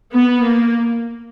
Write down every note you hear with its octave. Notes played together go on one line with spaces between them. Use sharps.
B3
A#3